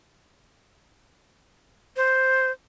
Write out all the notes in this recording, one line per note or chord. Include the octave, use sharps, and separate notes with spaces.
C5